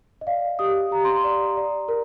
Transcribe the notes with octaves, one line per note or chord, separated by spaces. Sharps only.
D#5
D5 F5
G4 D#6
G4 A#5
C6
A#5
D5
D5
A#4